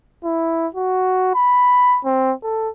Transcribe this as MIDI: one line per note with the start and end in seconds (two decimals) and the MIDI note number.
0.24 0.67 64
0.74 1.32 66
1.34 1.99 83
2.05 2.33 60
2.43 2.69 69